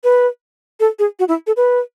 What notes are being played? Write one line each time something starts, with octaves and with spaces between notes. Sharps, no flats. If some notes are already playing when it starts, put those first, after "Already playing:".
B4
A4
G#4
F#4
E4
A4
B4